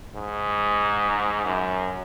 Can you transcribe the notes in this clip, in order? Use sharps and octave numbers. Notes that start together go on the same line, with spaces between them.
G#2
F#2